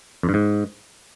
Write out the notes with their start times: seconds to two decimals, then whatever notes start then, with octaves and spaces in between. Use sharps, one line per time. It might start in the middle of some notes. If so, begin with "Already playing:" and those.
0.23 F2
0.29 G2
0.34 G#2